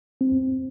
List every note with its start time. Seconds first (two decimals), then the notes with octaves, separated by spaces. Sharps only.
0.21 C4